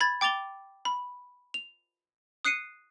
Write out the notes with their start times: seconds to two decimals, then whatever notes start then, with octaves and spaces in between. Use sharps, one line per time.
0.01 B5 G#6 A6
0.21 G5 D6 A6 F7 G7
0.85 B5
1.54 F7
2.45 D#6 F#6 C7 C#7 D#7